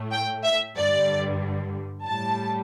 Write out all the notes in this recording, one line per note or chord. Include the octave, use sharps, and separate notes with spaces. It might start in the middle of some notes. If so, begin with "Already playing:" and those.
Already playing: A2 A3
G5
E5
G2 D3 G3 D5
A2 G3 A5